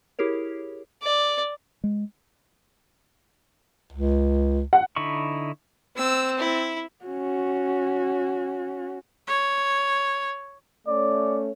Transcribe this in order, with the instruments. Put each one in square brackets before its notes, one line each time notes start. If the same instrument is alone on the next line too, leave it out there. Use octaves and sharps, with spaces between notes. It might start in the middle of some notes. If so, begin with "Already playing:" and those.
[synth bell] E4 G4 G#4 A#4 C#5
[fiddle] D5
[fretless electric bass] G#3
[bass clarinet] C#2
[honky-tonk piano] F#5
[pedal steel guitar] D3 D#4 E4 B5 C#6
[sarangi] C4 [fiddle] E6
[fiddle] E4
[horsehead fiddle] C#4 F#4
[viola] C#5
[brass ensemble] A3 C#4 C#5 [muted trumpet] D5